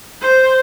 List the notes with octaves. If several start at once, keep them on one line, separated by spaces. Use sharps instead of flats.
C5